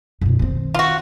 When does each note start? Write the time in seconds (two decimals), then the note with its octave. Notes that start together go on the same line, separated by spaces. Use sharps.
0.21 F#2 B2
0.39 D#3 C4
0.74 F4 F#4